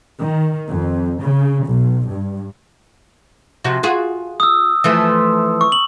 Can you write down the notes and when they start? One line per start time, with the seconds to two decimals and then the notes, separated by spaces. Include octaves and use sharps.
0.19 D#3
0.69 F2
1.20 C#3
1.65 B1
2.06 G2
3.64 C3 F3 F#4
3.83 F4 F#4 G#4
4.40 D#6 E6
4.84 E3 F3 A3
5.61 C#6
5.72 F#7